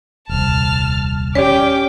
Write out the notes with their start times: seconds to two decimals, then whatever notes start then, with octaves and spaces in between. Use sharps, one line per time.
0.29 D#1 C2 A5 F6
1.35 C#4 G4 C#5 D5 G5 D6